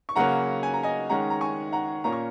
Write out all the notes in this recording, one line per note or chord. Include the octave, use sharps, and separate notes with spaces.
C#6
C#3 F#3 A#3 C#4 F#5 A#5
G#5
A#5
D#5 G#5
D#3 G#3 C#4 F#5 A#5
A#5
G#5 C#6
F#5 A#5
A#2 A#3 C#4 A#5
C#6